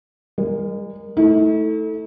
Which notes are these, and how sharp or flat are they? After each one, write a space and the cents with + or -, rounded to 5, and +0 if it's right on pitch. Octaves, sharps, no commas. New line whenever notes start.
G#3 -35 A#4 +0
A3 +0 E4 -45